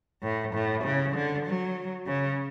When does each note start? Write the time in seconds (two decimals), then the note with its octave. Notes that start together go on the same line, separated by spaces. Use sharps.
0.23 A2
0.54 A2
0.84 C#3
1.15 D3
1.46 F#3
2.07 C#3